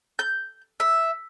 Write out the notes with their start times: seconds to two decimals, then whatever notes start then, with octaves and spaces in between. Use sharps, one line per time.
0.19 G6
0.80 E5